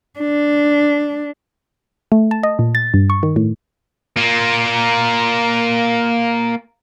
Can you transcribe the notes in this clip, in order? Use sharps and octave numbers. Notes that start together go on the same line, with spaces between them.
D4
A3
A5
D#5
A#2
A6
G2
C#6
D#3
A2
A#3 F4